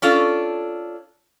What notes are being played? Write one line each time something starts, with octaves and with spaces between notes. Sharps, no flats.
C#4 D4 F4 A4